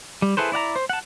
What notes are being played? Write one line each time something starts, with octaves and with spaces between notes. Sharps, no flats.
G3
E4 G#4 A4 B4 C5
E4 D5 F#5 A#5
C5
F#5 A5